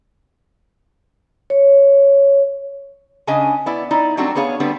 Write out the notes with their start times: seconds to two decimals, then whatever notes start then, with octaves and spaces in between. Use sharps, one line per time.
1.50 C#5
3.27 C#3 C#4 D4 D#5 G#5
3.66 B3 E4 D5
3.91 D#4 E4 D5
4.17 F#3 G3 A3 C4 D4 F#4
4.35 B3 D4 G#4 C#5 F5
4.60 D3 G3 B3 C4 D4